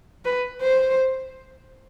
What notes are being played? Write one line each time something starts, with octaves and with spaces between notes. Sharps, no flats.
B4
C5